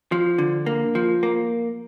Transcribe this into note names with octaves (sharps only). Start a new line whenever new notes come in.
F3
D3
A#3
F3
A#3